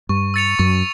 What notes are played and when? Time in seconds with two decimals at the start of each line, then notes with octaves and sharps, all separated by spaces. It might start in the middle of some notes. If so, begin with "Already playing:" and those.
0.09 G2 C#6
0.34 E6 A6 C#7 F7
0.59 F#2 C#6